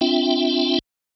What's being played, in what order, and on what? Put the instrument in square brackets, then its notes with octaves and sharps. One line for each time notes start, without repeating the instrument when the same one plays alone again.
[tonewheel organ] C4 D4 F4 E5 G5